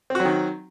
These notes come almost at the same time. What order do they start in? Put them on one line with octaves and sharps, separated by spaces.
C4 F#4 F#3 D#3